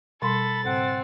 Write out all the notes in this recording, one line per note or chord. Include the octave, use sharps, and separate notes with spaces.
B2 G3 A4 B5 C6 A6
G#2 C#3 C4 F#5